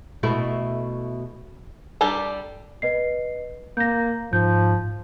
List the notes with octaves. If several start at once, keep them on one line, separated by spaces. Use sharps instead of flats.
B2 A3 E4
G3 D4 G4 A4 A#5
B4 D#5 C7
A#3 G6 A#6
G#2 F3 G6